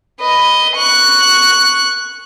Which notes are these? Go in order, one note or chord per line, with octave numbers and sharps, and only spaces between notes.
B4 D#5
C#6 F#6